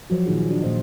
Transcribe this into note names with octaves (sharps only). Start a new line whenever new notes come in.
F3 F#3 F#4
A#2 D#3 D#4 G#4
D4 F#4
A#2 C5 D#5